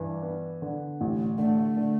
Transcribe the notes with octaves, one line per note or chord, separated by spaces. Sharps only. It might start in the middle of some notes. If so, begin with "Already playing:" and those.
Already playing: G2 E3
B3
D3
A1
D3 A3
D3